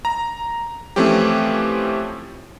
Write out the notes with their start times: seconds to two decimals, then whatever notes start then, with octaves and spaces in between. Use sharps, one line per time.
0.05 A#5
0.96 E3 F3 A3 C4 C#4 G4